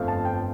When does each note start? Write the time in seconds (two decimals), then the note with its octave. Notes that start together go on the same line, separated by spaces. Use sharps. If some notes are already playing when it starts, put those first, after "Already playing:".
Already playing: G1 F2 F3 A3 F5
0.08 A5
0.25 G5